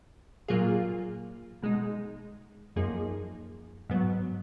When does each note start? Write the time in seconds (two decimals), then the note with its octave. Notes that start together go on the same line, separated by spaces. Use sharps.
0.48 A#2 F#3 A#3 F4 G#4
1.62 B2 G#3 D#4
2.76 F#2 F3 A#3 D#4 G#4
3.90 G#2 F#3 B3